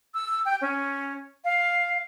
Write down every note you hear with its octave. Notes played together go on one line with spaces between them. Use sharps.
E6
G5
C#4
F5